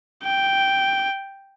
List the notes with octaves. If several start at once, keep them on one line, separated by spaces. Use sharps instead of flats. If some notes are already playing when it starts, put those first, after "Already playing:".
G5